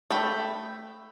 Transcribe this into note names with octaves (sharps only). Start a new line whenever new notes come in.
A3 G5 B5